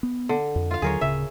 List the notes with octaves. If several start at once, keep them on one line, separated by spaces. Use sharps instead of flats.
B3
D3
F2
F4 F5
D#2 D3 F#3 G#4 A#4 C#5
D1 C#3 E5